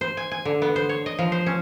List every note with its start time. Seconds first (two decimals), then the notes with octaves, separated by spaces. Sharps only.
0.01 C5
0.17 G#5
0.31 G#5
0.45 D3
0.62 B3
0.76 C5
0.89 C#5
1.06 D#5
1.19 F3
1.32 C5
1.46 C#4